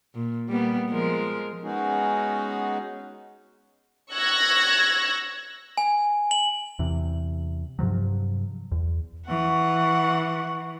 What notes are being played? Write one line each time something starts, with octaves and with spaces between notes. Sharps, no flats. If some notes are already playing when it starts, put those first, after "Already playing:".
A#2
G3 A#3 B3
F3 G#3 A#4
G#3 B3 C#4 D#4 F#4 G#4
C#6 E6 F#6 G#6 A#6
G#5
F#7
E2 C3
G2 C3 F3 F#3
E2
E3 F#5 C#6